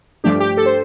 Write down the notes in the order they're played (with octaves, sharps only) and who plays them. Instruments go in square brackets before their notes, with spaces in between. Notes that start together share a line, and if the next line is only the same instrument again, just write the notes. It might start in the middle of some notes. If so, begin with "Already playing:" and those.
[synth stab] G2 F3 A3 D4 G4
G4
A4
C5